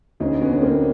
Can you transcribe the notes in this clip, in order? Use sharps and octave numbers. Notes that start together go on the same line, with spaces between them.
D2 C#4 D#4
B3 C#4
D3 C#4
A#3 C4